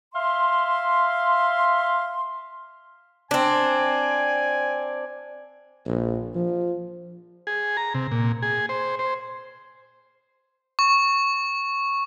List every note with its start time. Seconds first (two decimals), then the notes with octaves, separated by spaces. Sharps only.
0.15 E5 F5 C6
3.31 C4 D4 G#5
5.86 A#1
6.35 F3
7.47 G#4
7.77 A#5
7.94 C3
8.11 A#2
8.42 G#4
8.69 C5
8.99 C5
10.79 C#6